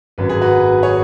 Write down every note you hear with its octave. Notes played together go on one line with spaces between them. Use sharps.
G#1 F#2 F#3 B4
G#4
F#4 B4
G#4 C#5